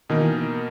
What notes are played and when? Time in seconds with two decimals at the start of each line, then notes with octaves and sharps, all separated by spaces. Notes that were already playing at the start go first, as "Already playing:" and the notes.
0.09 B2 D#3 A#3 D#4 A#4
0.20 E3